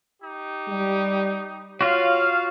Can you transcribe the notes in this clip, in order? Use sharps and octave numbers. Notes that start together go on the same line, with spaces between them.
D#4 G4
G3
F4 F#4 C#5 F5